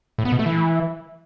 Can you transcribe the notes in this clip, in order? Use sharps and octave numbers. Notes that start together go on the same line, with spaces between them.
A2
B3
B2
A3
E3